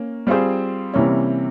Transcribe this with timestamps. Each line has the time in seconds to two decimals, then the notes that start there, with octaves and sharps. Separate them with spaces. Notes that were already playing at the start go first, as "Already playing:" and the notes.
Already playing: A#3 C#4
0.27 G3 C4 F4 G#4 C5
0.94 C3 E3 G3 A#3 C#4